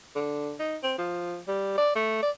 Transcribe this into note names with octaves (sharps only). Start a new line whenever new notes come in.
D3
D#4
C4
F3
G3
D5
A3
D5